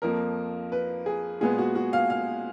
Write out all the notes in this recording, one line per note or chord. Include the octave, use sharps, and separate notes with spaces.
F2 F3 A#3 A#4
B4
G#4
A#2 G#3 B3 G#4
F#4
F#4
F5
F5